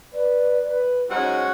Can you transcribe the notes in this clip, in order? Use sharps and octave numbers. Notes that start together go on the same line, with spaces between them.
B4 D5
B4
G#3 C#4 D#4 F#4 C5 F#5